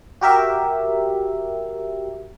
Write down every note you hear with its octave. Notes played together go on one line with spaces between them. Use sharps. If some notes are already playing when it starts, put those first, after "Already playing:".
F#4 G4 A#4 E5